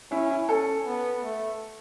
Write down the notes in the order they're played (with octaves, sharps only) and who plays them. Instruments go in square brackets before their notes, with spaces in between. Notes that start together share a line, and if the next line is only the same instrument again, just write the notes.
[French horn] C#4 [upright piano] E4
[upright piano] E4
[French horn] C#4 [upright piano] A4
[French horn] B3
A3